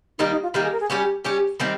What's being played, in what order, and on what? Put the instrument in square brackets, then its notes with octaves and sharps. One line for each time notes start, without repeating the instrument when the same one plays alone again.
[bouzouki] D#3 G3 A#3 [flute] D#4
[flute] D#4
F4
[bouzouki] D#3 G3 A#3 [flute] G4
[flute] G#4
A#4
G#4
[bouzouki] G3 C#4 G4
G3 C#4 G4
D#3 G3 C4